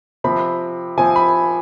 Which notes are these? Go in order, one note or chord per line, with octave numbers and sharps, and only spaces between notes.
C3 F3 C4 B5
C3 F3 C4 G#5
B5